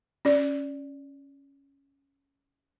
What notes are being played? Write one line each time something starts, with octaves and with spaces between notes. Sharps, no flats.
C#4 D5